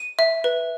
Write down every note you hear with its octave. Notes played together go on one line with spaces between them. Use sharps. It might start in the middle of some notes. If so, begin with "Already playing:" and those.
Already playing: D#7
E5
B4